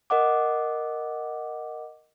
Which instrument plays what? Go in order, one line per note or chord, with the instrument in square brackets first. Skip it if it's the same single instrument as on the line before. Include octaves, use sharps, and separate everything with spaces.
[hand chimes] A#4 D#5 F#5 D6